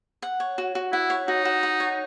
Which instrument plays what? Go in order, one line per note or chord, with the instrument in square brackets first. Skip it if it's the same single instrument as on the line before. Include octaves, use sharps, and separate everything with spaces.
[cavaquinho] F#5
C#5
F#4
F#4
[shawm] E4 [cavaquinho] F#5
[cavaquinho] C#5
[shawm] D#4 [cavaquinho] F#4
[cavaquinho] F#4
F#5
C#5